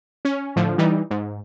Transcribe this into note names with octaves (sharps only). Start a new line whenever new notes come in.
C#4
A2 D3 F3
E3 G3 D#4
G#2